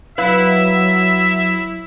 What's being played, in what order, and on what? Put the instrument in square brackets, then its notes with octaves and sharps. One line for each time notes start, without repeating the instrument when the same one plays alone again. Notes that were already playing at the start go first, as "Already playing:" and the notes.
[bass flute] F#3 [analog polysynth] E4 [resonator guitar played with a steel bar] B4 F5 [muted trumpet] E5